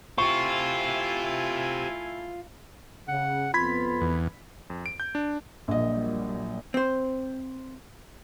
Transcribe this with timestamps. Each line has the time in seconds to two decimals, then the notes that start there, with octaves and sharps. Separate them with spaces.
0.18 A3 E4 F4 G4 C5 G#5 C#6
3.08 C#3 F#5
3.54 F2 B3 F4 B5 G#6 B6
4.01 E2
4.70 F2
4.86 D7
5.00 G6
5.15 D4
5.68 A#1 A#2 F#3 G3 D#5
6.74 C4 C5